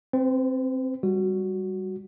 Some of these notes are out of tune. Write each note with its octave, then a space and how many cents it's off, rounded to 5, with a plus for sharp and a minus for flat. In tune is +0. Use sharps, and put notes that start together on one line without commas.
C4 +5 C5 -45
G3 +0 F#4 +0